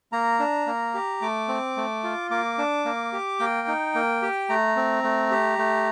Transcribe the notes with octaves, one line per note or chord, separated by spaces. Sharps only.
A#3 A#5
D4
A#3
G4
A3 D6
C4
A3
F4
A#3 D6
D4
A#3
G4
A#3 G5
D#4
A#3
G4
A3 A#5
C4
A3
G4
A3